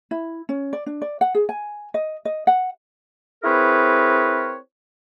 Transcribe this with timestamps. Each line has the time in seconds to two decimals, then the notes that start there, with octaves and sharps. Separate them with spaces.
0.11 E4
0.49 C#4
0.73 D5
0.86 D4
1.02 D5
1.21 F#5
1.35 G#4
1.49 G#5
1.94 D#5
2.25 D#5
2.47 F#5
3.44 C4 E4 G#4 A#4 B4 C#5